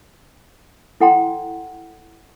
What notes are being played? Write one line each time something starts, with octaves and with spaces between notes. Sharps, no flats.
E4 A4 F#5 G5 A#5 C6